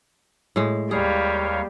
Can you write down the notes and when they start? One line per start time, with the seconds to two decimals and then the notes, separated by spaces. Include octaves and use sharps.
0.56 A2 G#3
0.91 D#2 G3 G#4 C#5 F5